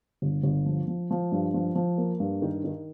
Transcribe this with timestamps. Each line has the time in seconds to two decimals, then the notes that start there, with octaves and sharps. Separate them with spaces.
0.22 G1
0.43 G1
0.66 F3
0.87 F3
1.11 F3
1.32 G2
1.54 F3
1.75 F3
1.98 A#3
2.20 G2
2.42 D#3
2.64 D#3